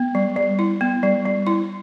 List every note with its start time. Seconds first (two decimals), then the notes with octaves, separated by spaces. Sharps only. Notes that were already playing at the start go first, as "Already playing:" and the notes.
Already playing: B3
0.15 G3
0.36 G3
0.59 E4
0.81 B3
1.03 G3
1.26 G3
1.47 E4